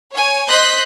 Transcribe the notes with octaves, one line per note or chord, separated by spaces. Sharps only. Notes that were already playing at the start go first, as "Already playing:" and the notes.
C#5 G#5
C5 D#5 C6 F#6 G6 B6